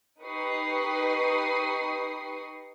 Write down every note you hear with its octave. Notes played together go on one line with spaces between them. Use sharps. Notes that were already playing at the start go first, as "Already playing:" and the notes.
D#4 G4 B4 C#6 D#6 C7